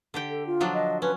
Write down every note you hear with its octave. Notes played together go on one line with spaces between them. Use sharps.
D3 G4 G5
A4
F4
F3 F#3 D4
D#5
C#4 B4